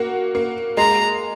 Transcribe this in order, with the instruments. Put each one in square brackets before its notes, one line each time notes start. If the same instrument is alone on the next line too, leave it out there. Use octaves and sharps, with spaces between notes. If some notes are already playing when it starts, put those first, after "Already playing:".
Already playing: [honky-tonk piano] A#3 F#4
A#3
[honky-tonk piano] G#3 [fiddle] A#5